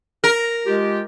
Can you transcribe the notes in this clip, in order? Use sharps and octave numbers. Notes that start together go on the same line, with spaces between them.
A#4
G#3 F4 G4